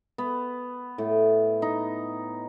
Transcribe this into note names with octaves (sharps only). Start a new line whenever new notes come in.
B3
A2
D#4